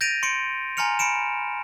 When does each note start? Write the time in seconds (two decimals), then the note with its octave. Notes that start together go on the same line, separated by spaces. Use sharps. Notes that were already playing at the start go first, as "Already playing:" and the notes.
0.01 G6 A6 A#6 D7 D#7 F7
0.23 C6 C#7 D7
0.77 G#5 A#5 C6 F6 C#7 F7
0.99 B5 C#7 D7 E7